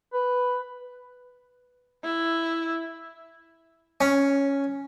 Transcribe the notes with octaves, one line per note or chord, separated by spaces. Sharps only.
B4
E4
C#4